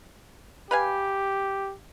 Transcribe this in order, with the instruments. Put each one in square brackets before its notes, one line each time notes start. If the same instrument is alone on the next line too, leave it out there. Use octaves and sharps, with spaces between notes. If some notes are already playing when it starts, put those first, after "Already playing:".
[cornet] G4 [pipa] B4 F5 G#5